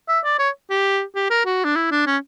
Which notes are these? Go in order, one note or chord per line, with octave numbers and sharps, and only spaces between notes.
E5
D5
C#5
G4
G4
A#4
F#4
D4
E4
D4
C#4